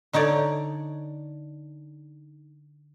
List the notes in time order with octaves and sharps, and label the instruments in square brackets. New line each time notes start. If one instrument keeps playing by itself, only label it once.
[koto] D3 D#4 C#5 D5